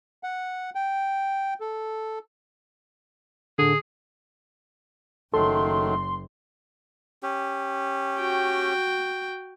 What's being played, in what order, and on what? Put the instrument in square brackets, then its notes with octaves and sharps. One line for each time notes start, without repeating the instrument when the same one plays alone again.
[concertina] F#5
G5
A4
[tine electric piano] A2 D3 [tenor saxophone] G#4
[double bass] F#1 [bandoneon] D#3 F#3 A3 [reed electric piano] A4 [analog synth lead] C6
[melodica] C#4 G4
[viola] F#4 G5